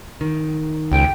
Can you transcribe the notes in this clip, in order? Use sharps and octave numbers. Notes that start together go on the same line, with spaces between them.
D#3
C#2 G5